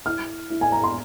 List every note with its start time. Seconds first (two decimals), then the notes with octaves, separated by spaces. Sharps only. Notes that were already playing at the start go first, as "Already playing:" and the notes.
0.05 E4 F6
0.50 E4
0.61 G#5
0.72 A#5
0.84 C6